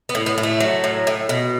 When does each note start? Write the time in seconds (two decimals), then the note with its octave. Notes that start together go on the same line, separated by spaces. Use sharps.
0.09 B3
0.15 A2
0.26 B3
0.38 A2
0.43 A3
0.60 F#3
0.84 A2
1.07 A2
1.29 B2